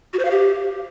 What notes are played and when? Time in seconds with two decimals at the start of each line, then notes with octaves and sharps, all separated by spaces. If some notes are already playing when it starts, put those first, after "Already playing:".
0.13 F#4
0.19 C5
0.25 F5
0.31 G4